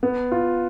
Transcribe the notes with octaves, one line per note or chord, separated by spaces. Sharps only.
B3
F4